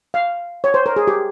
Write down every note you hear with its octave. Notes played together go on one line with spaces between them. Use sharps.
F5
C#5
C5
A#4
G#4
G4